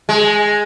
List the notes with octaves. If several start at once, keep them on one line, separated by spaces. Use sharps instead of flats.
G#3